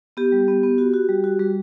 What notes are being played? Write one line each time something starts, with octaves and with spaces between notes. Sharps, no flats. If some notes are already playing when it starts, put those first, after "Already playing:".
B3 G4
G3
B3
B3
F#4
F#4
G3
F#4
G3